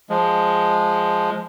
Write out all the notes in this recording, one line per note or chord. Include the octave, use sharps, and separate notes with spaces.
F3 G#3